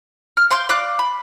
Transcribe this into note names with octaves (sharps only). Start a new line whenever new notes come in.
F6
F5 C6 D6 G6
D5 F5 D6 F#6
B5